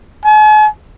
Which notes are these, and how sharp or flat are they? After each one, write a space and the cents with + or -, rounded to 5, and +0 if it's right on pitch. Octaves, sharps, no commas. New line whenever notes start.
G#5 +45